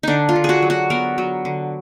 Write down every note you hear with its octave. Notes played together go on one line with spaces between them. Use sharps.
D3 D4 D#4
F4
D3
F#4 G#4
F#3
F#4
B3 A#4
F#3
D3